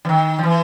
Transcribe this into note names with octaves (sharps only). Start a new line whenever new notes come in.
E3
D#3
F3
E3